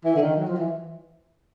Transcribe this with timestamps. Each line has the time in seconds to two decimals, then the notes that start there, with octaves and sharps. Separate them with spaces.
0.04 E3
0.15 D3
0.22 D#3
0.37 F#3
0.47 F3
0.57 E3